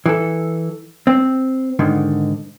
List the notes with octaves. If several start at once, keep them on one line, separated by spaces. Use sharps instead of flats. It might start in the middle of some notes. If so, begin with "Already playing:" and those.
E3 A4
C4
G#2 D3 D#3